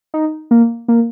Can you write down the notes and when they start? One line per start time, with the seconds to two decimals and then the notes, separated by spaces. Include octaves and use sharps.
0.14 D#4
0.51 A#3
0.88 A#3